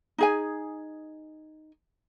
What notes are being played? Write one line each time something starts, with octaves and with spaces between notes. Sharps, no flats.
D#4 G#4 G#5